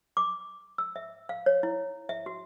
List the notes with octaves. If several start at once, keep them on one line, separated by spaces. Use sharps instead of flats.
D6
E6
E5
F5
C#5
E4
E5
F#4